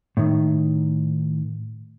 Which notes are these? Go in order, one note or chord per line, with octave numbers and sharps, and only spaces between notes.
A2 D#3